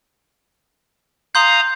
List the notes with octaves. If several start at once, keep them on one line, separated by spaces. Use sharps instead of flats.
F5 A#5 C6 D#6 G6